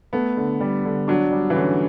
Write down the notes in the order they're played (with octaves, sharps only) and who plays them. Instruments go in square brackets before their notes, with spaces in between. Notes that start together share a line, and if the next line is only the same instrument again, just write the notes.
[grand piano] A3 [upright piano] B3
[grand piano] D3
G3
D3
[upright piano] F#3 [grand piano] D4
[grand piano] G3
[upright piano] E3
[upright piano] D3 [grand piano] C#4